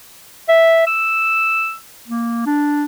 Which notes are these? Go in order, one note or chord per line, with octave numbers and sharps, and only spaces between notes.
E5
E6
A#3
D4